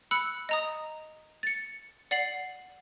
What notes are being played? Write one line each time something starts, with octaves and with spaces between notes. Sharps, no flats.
B5 E6 F#6 C#7
D#5 A#5 D#6
A6 C#7
D5 F#5 A6 C7 F#7